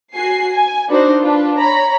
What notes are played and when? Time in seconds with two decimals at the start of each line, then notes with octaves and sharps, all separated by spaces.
0.14 F#4 G#5 C7
0.52 G#5
0.89 D4 D#4 F#4 B4 C5
1.19 D4 F4 B4
1.58 C#5 A#5 B5